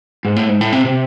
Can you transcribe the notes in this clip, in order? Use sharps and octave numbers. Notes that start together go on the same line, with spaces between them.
G#2
A2
G#2
A2
C3
C3